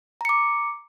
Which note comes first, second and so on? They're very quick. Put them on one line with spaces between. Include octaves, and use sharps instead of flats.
A#5 C#7 D6